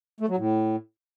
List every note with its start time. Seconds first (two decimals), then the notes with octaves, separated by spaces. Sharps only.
0.20 A3
0.29 F#3
0.37 A2